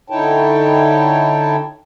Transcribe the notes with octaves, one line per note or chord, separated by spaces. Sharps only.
D3 D#4 E4 C#5 G5 A5